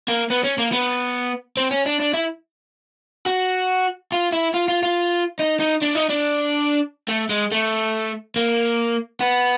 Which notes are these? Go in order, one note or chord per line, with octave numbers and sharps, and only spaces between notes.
A#3
B3
C#4
A#3
B3
C4
C#4
D4
D4
E4
F#4
F4
E4
F4
F4
F4
D#4
D#4
D4
D#4
D4
A3
G#3
A3
A#3
B3